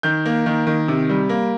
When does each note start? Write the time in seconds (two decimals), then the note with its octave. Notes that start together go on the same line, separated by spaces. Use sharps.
0.03 D#3 G6
0.26 A#3
0.46 D#3
0.67 D#3
0.88 C3
1.10 G3
1.29 A#3